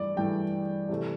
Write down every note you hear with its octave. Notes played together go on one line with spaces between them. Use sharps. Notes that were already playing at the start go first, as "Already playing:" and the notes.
Already playing: G2 E3 A3 D5
G2 E3 A3 G5
C3 E3 A3